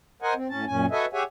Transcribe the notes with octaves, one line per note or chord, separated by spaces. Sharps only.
A#4 C5 D#5 F#5 G#5
C4
A2 C#4 A5
F#2 A#2 C#4 G#5
F#4 A4 B4 D#5 E5 G#5
G4 G#4 C#5 E5 F#5 G#5